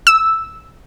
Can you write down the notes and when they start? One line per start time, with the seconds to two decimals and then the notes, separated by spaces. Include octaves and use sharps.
0.07 E6